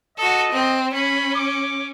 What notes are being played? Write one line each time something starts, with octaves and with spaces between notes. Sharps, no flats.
F#4 A4 D#5
C4
C#4 B5
D6